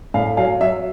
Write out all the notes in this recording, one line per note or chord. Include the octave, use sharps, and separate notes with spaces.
A2 F5
F#3 F5
F#3 E5